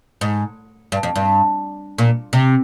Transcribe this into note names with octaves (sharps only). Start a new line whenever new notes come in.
G#2
G2
F2
G2
A#2
C3